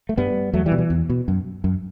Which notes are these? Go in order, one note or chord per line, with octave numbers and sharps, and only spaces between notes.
A3
G2 G3 B3
E2 F#3 A3
E3 G3
B2
E3
E2
B2
F#2
F#2